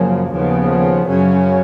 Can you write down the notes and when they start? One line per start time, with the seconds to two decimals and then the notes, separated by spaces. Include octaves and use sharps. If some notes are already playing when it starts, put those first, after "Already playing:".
Already playing: F#2 C#3 F3 A#3 C#4
0.30 D#2 C#3 F3 B3
1.05 F#2 C#3 F#3 C#4